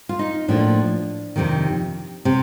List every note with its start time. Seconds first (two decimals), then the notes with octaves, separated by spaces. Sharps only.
0.09 F4
0.19 D#4
0.48 A2 F3 A#3 D4
1.36 F2 C3 D#3
2.25 C3